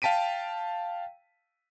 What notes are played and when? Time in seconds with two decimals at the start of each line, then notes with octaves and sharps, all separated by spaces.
0.02 F5 G5 A5 B6 D7 D#7